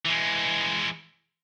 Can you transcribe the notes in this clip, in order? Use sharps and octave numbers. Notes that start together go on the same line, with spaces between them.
E3 G#3